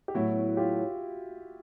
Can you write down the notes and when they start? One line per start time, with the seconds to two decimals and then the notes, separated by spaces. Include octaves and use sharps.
0.08 G4
0.14 A2 F#3 B3 E4 F#4
0.57 F4 G4